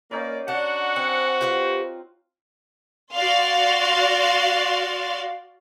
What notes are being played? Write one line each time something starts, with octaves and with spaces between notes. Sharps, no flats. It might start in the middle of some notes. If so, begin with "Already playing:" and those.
A#3 C#4 D#4 B4 D5
D4 F#4 F#5
C4 G#5
F4 G4 B4 C5
F#4 D5 F5 C6